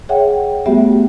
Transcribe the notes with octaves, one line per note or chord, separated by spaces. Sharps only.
G#4 C#5 E5 F#5 G5
G3 A3 B3 F#4 G4 E5